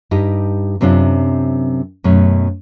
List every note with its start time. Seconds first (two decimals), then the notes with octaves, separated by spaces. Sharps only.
0.11 G2 D#4 G4 D#5
0.81 F#2 C3 C4 D4 F4
2.04 F#2 B2 A3 C#4